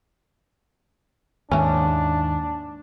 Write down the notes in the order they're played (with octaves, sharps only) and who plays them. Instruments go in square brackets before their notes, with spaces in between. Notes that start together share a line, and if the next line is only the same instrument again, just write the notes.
[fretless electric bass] D#2 G#2 [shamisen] E3 C#4 [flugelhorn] D4